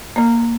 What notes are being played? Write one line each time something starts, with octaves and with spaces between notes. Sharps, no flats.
A#3